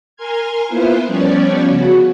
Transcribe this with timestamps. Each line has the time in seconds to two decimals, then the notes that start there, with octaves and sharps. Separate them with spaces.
0.16 A#4 G#5 C6 F6 G#6
0.66 A#3 B3 E4 F4 B4 C5
1.07 F3 G3 B3 C#4 C#5 D5
1.65 C#3 B3 F#4